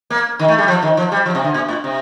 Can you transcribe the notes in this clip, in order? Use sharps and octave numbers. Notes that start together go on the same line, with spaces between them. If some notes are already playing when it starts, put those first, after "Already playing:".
A#3
D#3
A3
G3
F3
D#3
F3
G3
F3
C3
D3
A#2
A2
C3